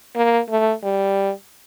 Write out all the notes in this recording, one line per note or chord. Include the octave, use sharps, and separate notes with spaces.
A#3
A3
G3